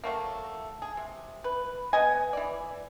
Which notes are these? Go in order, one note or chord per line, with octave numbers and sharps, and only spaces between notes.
F#3 A3 A#3
G#4
C3
B4
B3 D#5 G#5
E3 D5